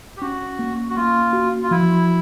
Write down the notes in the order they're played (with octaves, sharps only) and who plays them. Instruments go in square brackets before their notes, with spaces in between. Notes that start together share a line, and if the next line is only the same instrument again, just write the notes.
[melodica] G4
[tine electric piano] C#4 [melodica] F#4
[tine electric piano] A#3
[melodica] F#4
[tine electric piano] A#3 [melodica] F4
[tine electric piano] F#4
[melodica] F4
[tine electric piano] F3 [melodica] E4